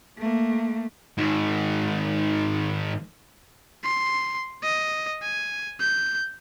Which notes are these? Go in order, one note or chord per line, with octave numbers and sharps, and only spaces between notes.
A3 A#3
G#2 D#3
C6
D#5
G#5
G6